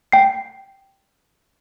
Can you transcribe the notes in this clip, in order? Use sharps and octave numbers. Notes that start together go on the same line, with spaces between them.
G5 C7